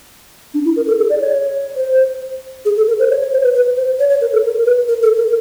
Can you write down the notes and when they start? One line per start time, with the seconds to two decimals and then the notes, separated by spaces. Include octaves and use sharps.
0.54 D4
0.65 E4
0.76 A#4
0.87 A4
0.98 G#4
1.10 D5
1.21 C#5
1.76 C5
2.65 G#4
2.76 A4
2.88 A#4
2.99 C5
3.10 C#5
3.21 C#5
3.33 C5
3.43 B4
3.54 B4
3.77 C5
3.99 C#5
4.10 C#5
4.21 A#4
4.33 A4
4.44 A#4
4.66 B4
4.88 A#4
5.03 A4
5.17 A#4